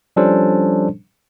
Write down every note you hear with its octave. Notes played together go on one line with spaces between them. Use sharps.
F3 G3 C#4 D4 A4 C5